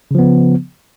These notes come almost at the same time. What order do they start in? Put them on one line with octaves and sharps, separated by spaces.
C#3 F3 B3